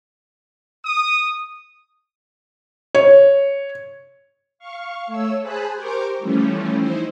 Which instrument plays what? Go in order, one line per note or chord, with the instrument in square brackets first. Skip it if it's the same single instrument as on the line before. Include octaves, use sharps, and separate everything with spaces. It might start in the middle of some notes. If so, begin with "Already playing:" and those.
[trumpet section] D#6
[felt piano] C#5
[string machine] F5 C#6
A3 C#5 E6
G#4 C5 G#5 A5 B5 F#6
G4 A#4 C5 G5 C#6 D6
E3 F3 G3 A3 C#4
D#4 E4 C5